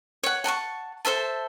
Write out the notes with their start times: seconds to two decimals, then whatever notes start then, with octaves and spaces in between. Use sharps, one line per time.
0.23 C#5 F#5
0.44 F#5 A5 C6 C#6
1.05 A4 C5 E5 A5